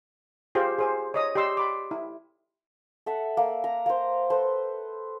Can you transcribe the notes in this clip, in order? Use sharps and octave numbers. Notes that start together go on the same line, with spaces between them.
F4 G4 G#4 C5 G5
G#4 C5 G#5
C#5 D#5 D#6
G4 D5 D#5 C6 E6
B5 C6 D6
E4
A4 E5 F#5
A#3
A#5
A#3 C5
A4 B4 C5